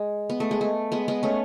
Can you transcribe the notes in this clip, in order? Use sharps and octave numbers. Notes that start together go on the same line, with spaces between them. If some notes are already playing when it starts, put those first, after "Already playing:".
Already playing: G#3
B3
A3
G#3
A3
G#3 B3
G#3 B3
A3 C#4